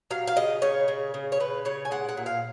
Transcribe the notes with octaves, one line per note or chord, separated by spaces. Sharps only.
F#3 F5
F5
C#3 D#5
C#3 C#5
C#3
C#3
C#5
C#3 B4
C#3 C#5
G#5
G#3 F#5
F#5
A#2
F5